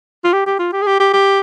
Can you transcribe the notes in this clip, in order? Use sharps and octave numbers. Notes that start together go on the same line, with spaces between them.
F4
G4
G4
F4
G4
G#4
G4
G4
G4